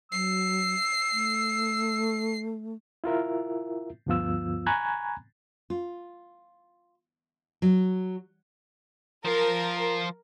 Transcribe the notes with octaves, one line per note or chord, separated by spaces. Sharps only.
F#3 E6 C7
A3
E4 F4 A#4 E5
D2 G2 F3 B3 F4 E6
G#5 A#5 B5 C#6 F#6 G#6
F4
F#3
F3 F4 A#4